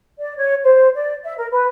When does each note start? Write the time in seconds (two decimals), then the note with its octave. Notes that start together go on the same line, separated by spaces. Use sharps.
0.19 D5
0.37 C#5
0.64 C5
0.95 D5
1.24 E5
1.38 A#4
1.51 B4